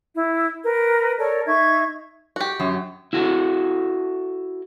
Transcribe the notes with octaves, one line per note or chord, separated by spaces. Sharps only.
E4
A#4 B4
A4 A#4 C#5 D5
D#4 E5 C#6 G#6
F#4 G4
F#2 F#3
E4 F#4 A4